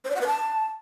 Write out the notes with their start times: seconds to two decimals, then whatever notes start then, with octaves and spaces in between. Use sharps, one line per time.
0.05 C5
0.10 D5
0.16 F#5
0.21 B4
0.27 A5